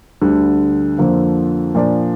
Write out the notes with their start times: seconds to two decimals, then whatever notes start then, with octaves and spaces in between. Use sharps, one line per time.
0.22 D2 D3 G3
0.98 F2 D3 F3 A#3 F4
1.75 A#2 F3 D4